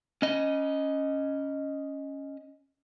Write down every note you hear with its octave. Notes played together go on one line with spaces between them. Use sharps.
C#4 D#5